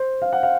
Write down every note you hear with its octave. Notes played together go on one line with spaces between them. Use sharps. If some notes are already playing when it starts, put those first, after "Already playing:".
Already playing: C5
F5
F#5
F5